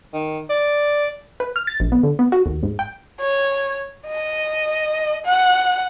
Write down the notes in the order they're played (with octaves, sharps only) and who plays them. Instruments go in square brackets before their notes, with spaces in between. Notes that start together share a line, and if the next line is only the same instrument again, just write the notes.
[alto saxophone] D#3
D5
[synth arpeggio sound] B4
F6
A6
A#1
B3
D3
B3
F#4
D#2
G#2
G5
[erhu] C#5
D#5
F#5